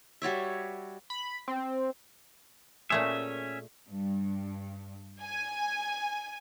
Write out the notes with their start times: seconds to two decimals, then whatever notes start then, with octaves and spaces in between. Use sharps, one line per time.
0.22 G3 F#4 C#5 E5
1.10 B5
1.48 C4
2.90 A#2 A3 C#4 G#4 E5
3.89 G2
5.21 G#5